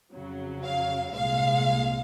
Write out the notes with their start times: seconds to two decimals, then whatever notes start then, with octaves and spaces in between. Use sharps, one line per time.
0.14 F2 C#3 F#3
0.64 F5
1.14 C2 A#2 G#3 F5